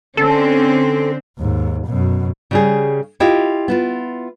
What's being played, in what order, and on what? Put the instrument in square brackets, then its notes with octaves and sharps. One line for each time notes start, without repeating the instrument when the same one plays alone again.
[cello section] D3 C4 [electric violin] C#4 [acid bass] A4
[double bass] D#2 G#2
F#2 B2
[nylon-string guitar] C#3 G3 G#4
E4 F4 G4 D#5 F5
B3 E4 F4